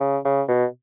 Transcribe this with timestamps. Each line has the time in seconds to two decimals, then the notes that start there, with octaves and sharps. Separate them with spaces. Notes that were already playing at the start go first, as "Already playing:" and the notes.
0.01 C#3
0.25 C#3
0.48 B2